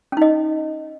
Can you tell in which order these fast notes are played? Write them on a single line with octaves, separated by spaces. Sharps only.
C#4 D#4 D#5